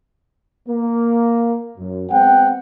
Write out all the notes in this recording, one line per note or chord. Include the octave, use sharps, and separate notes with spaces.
A#3
F#2
G#3 B3 C4 F#5 G5